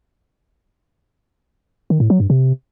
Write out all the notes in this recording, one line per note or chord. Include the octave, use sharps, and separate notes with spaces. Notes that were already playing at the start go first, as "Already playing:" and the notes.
D#3
A2
F#3
G2
C3